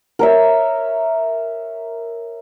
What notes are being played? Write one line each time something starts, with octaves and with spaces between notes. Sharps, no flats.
A#4 C#5 E5